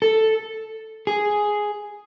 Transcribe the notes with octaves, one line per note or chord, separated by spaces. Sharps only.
A4
G#4